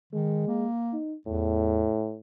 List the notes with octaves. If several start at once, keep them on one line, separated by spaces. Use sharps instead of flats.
D#3 G#3
A#3
D#4
E2 A2